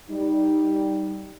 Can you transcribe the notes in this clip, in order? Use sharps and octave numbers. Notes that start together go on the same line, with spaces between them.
G3 D#4